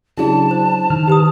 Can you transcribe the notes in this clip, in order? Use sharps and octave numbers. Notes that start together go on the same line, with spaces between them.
C#3 F#3 D4 E4 G#4 A5
C5
D#3 F6
G4 B4 D#6